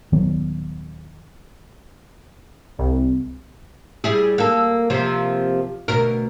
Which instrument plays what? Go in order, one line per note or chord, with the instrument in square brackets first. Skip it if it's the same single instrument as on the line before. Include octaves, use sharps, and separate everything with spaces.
[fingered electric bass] D#1 D#3 F#3 B3
[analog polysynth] C2
[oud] G3 E4 G#4
A#3 A4
C3 F3 A#3
D2 B2 A#4